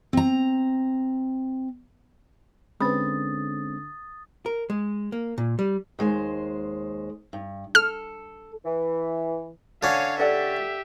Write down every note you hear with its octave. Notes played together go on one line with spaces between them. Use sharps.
C4 A#5
D3 G#3 C4 C#4 B4 B5 D#6 A6
A#4
G#3
A#3
A#2
G3
D#2 G#3 C5
G2
A4 F6
E3
D3 C#4 C#5 F5
G4 A4 D5 E5 F#5